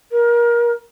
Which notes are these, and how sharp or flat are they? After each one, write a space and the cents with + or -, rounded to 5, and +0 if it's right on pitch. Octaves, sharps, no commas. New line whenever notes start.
A#4 +25